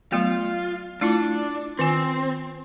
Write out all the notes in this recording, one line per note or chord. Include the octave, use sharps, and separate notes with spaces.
F#3 A3 B3 F4
A3 D4 E4 F4
D#3 C4 F4 G#5